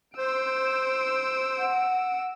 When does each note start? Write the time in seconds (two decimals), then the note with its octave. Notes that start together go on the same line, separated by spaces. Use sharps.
0.18 C5 E6 D7
1.58 F#5